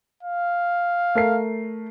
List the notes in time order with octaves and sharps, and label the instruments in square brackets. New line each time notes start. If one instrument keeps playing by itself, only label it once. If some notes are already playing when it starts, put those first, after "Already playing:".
[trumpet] F5
[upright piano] A3 A#4 C7